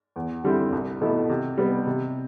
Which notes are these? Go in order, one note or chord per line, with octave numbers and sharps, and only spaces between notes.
E2
D3 G3 C4 E4
C2
B2 A3 E4
C3
G3 B3
C3